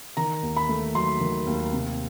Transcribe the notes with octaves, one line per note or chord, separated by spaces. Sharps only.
D#3 A#5
D#2
B5
A3
F#3 C6
D#3
D#2
C3